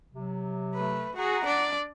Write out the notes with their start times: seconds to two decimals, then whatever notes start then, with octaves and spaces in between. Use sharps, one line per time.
0.12 C3 F#3
0.74 A3 B4
1.16 F#4 G#4 F#5 A#5
1.45 D4 D5